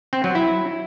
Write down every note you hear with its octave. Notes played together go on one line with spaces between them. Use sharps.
C4
F#3
E4